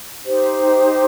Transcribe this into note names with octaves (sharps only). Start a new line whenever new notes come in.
D#4 G4 C5